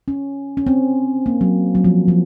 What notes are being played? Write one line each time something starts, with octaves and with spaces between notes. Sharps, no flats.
C#4
C#4
C4
A#3
F#3
F#3
F3
F3